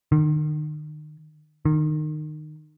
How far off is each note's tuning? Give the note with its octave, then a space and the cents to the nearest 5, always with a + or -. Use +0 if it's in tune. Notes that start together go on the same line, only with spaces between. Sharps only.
D#3 -40
D#3 -25